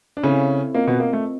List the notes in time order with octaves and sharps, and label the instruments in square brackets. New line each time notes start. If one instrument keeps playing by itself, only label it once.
[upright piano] D4
[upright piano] C#3 C#4 [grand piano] C4 E4 A4 C#5
[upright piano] A#3 [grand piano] C4 F4 A#4 D#5
[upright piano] B2 B3
A#3
A3